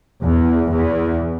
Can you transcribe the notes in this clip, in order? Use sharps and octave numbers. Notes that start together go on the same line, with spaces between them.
E2
E2